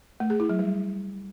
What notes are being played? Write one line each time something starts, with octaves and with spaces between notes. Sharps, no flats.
A3
G#4
E4
F#3
G3